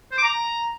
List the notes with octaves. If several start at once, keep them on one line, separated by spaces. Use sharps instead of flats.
C5
D6
A#5